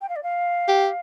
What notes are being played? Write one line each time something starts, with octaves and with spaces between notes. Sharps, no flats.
G5
F5
D5
F5
G4